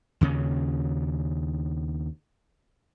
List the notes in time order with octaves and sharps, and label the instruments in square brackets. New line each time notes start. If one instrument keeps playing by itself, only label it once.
[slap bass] D#2 C#3 C#4